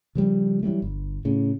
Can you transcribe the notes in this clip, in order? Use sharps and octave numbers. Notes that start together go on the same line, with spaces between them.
C#3 F3 G3
E3 F#3 G3 A3
G1
A2 C#3